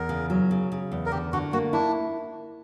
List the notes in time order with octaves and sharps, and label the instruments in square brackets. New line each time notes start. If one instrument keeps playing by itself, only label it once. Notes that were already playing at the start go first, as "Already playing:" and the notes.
Already playing: [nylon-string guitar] E2 [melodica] A#4
[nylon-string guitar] C#3
F#3
C#3
C#3
E2
[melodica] A#4
[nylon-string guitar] D3 [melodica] G4
[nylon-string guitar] D3 [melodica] F#4
[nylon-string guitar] A#3 [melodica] F#4
[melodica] D4 [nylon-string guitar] E4